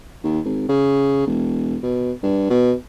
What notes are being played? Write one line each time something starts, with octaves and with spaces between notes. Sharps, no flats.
D#2
G#1
C#3
E1
B2
G2
B2